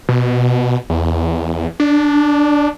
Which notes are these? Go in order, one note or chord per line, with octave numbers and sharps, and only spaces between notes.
B2
E2
D4